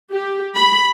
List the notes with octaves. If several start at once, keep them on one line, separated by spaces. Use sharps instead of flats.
G4
B5